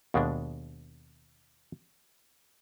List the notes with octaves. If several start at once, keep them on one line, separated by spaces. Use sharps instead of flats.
D#2 B2 G#3 D4